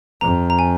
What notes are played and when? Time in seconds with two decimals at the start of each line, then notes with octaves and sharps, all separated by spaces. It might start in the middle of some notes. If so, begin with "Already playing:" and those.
0.21 F2 A#5
0.50 A#5
0.59 G#5